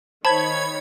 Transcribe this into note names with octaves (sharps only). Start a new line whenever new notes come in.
D#3 C5 C#5 A5 B5 G#6